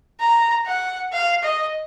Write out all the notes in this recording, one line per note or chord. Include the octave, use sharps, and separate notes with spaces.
A#5
F#5
F5
D#5